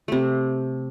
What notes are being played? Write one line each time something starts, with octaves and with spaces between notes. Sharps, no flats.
C3 A3